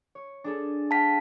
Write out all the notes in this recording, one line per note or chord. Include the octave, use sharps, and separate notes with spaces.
C#5
D4 G#4 A4
F5 G5 A5 B6